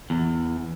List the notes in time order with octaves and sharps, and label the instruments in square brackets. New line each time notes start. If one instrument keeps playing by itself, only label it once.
[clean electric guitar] E2